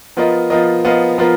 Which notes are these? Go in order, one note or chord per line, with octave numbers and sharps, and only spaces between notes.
F3 B3 F4 A#4 D#5
F3 B3 F4 A#4 D#5
F3 B3 F4 A#4 D#5
F3 B3 F4 A#4